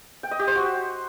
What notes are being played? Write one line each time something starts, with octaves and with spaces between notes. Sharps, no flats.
G5
D#5
G4
C5
F#4